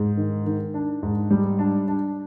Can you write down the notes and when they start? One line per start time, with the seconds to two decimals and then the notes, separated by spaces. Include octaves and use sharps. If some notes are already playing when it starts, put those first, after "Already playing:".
Already playing: G#2
0.17 D#3
0.46 D#3
0.74 D4
1.03 G#2
1.30 G3
1.59 D4
1.88 D4